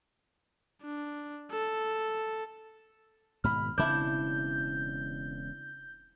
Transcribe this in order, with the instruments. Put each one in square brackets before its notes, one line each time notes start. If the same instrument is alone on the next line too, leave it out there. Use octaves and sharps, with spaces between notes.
[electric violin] D4
A4
[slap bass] G#2 B2 D#3 [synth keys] B5 F6
[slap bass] E1 C#3 C4 [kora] D4 E4 [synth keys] G6